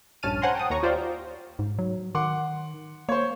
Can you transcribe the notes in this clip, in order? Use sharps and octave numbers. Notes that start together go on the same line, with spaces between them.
A#1 G2 C#4 A5 F6 D#7
C5 C#5 F#5 G#5 A#5 C6
G5 A5 D#6
D#2 C#5 A#5 C#6
F4 G4 C5 D5 F5 G5
G#2
F#3
D#3 F#5 C6 D6
A#3 C5 C#5